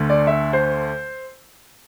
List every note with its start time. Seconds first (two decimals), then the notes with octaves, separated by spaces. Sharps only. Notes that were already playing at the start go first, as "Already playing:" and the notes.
Already playing: D2 D3 A3
0.09 D5
0.27 E5
0.53 C5